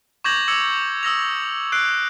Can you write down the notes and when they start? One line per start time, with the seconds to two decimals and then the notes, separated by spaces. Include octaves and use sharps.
0.24 C#6 D6 G6 G#6 A#6 F#7
0.48 D6 E6 G#6 C#7 F#7
1.03 D#6 E6 A#6 F7
1.72 E6 F#6 C7 D7